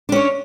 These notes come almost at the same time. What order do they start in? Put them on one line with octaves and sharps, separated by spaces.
D4 C#4 C#5